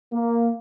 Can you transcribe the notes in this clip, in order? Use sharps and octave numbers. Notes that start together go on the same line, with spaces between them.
A#3